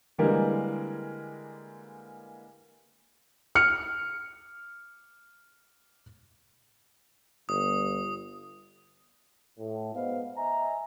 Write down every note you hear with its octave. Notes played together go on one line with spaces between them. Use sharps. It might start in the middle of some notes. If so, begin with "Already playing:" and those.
D3 E3 G3 G#3 A#3 A#4
F6 C#7
G1 D#6
A2
G#2 B2 B3 C5 D#5 F5
D#5 E5 G#5 A#5